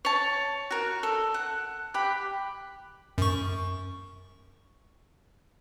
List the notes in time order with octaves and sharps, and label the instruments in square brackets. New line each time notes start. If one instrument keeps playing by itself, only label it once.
[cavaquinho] C#5 A5
F#4 A#4
A4
F#5
G4 F#5 B5
[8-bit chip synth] F#2 C#6